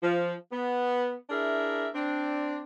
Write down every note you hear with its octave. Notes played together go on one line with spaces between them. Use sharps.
F3
B3
D4 E4 G#4 A#4 E5
C4 D4